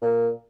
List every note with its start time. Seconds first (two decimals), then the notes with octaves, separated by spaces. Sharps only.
0.02 A#2